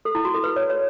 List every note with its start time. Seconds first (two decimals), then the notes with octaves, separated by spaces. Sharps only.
0.05 A4
0.15 E4
0.25 F#4
0.34 A4
0.44 B4
0.56 C#5
0.70 C#5